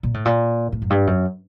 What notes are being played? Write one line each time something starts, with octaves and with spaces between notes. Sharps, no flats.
A#2
A2
A#2
A2
F#2
G2
F#2